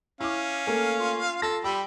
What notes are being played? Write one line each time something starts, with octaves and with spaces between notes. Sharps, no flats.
C#4 E4 F5 D6
A3 A#3 G#5
F4
A4 A#6
G3 G5 B5 E6